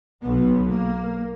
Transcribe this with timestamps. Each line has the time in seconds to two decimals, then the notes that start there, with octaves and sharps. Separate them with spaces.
0.22 B1 B2 B3
0.69 A#3